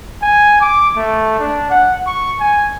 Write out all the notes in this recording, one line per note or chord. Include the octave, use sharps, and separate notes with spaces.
G#5
D6
A3
D4
F#5
C#6
G#5